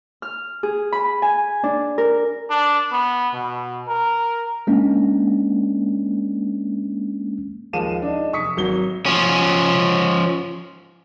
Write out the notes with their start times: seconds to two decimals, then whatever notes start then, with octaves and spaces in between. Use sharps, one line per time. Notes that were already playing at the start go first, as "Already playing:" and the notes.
0.22 F6
0.63 G#4
0.92 B5
1.22 G#5
1.64 D4
1.98 A#4
2.50 D4
2.92 B3
3.34 B2
3.88 A#4
4.67 G#3 A#3 C#4 D4
7.73 D#2 F3 G#3 F5 D#7 E7
8.02 D4 D#4
8.33 F1 C#6 D#6 B6 C#7
8.57 G#1 F#3 G7
9.06 F3 C#4